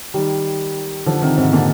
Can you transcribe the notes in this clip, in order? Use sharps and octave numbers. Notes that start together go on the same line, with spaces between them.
D#3 G3
D3 F3
C3 D#3
G#2 C3
A#2 D3